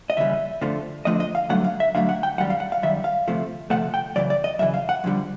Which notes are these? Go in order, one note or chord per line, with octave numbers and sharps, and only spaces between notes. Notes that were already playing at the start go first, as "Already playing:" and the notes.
D#5
D#2 C#3 E3 G3 E5
F2 D3 F3 A3
F2 D3 F3 A3 D#5
D#5
F5
G2 D3 F#3 A3 F#5
F5
E5
G2 D3 F#3 A3 F5
F#5
G5
F#2 D#3 G3 F#5
F5
F#5
F5
F#2 D#3 G3 E5
F5
D2 C3 F3 A3
D2 C3 F3 A3 F#5
G5
F#2 C#3 E3 D5
D5
D#5
F#2 C#3 E3 E5
F5
F#5
F2 D3 G3